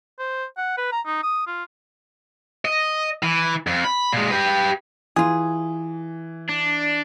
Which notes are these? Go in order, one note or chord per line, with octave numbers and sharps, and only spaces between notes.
C5
F#5
B4
A#5
D#4
D#6
F4
D#5
E3
F2
B5
A#2 G#3
G4 B4
E3 F4 G#4
D4